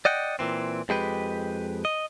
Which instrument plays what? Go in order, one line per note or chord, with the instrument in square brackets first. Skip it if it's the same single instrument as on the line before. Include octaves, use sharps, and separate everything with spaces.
[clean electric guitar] D5 D#5 F#5 G5
A#2 E3 C4
F2 G#3 G4 B4
D#5